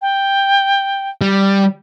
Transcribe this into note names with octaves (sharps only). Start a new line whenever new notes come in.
G5
G3